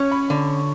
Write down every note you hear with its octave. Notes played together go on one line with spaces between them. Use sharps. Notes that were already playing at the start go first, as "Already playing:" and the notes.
Already playing: C#4 C#5 C#6
B5
D3